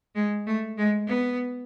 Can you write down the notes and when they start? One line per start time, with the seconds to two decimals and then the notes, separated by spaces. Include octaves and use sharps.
0.15 G#3
0.47 A3
0.78 G#3
1.08 B3